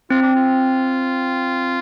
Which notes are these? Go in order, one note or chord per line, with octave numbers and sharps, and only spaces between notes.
C4 F4
D4
F4